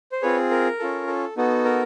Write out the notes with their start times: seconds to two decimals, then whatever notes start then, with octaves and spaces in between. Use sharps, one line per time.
0.12 C5
0.22 C4 F4 G#4 B4 C#5
0.51 A#4
0.79 C#4 F4 A4
1.07 A4
1.37 B3 D#4 F#4 A4
1.65 A#4